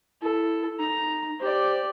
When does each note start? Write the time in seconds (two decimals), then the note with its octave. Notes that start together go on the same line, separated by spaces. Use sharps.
0.22 E4 A4
0.79 D#4 A#5
1.40 G4 C5 D5